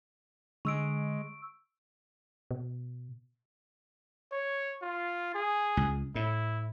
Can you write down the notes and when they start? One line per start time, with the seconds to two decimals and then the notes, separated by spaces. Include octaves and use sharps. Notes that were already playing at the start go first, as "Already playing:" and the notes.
0.65 D3 G#3 C#6 E6 D7
2.51 B2
4.32 C#5
4.82 F4
5.34 G#4
5.77 C#2
6.15 A2 E4